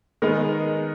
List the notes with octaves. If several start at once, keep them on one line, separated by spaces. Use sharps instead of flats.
D#3 G#3 B3 D#4 A#4